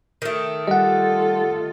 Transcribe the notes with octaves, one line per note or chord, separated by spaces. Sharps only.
D#3 A3
G3 F4 G4 A4 D#5 F#5